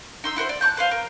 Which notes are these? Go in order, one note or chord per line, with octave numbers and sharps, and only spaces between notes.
D#4 C6 E6
E4 F#4 A#4 C5
D5
A5 C#6 F#6 G6
B4 C5 F5
A#4